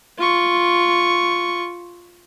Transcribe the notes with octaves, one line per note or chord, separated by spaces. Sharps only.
F4 C#6